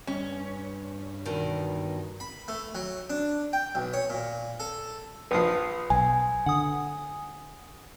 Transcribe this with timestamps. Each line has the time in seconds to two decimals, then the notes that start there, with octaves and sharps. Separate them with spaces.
0.07 G2 C#4
1.25 E2 B2 D#3
2.20 B5
2.48 A3
2.75 F#3
3.10 D4
3.53 G5
3.75 B1
3.93 C#5
4.10 A#2
4.60 A4
5.31 A#1 F3 B4 D#6 C7
5.90 B1 G#5
6.46 D3 F#5 D#6